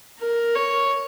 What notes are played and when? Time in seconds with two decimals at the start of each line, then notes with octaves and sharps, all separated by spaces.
0.19 A#4
0.56 C#5